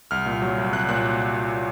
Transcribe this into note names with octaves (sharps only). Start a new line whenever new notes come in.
C2 F6
A#2
F#3
C2
C2 F#6
A#2 F#6